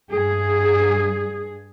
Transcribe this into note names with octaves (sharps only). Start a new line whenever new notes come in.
G2 G#4